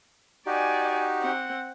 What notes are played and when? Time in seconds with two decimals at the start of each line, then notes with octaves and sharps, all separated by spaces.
0.46 D#4 F#4 G4 D5 G#5
1.21 C4 F#5